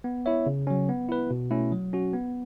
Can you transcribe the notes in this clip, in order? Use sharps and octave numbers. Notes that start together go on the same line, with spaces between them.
B3
E4 C#5 E5
C#3
F#3 C#4
B3
E4 B4
B2
A3 C#4 E4
F#3
C#4 F#4
B3